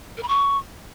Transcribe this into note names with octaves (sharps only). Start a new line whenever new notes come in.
A#4
B5
C#6